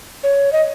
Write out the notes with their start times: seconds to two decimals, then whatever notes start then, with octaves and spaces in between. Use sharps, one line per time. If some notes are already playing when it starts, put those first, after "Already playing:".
0.23 C#5
0.52 D#5